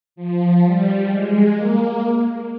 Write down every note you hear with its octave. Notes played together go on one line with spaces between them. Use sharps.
F3
G3
G#3
A#3